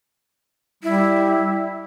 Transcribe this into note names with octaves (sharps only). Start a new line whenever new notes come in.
G3 E4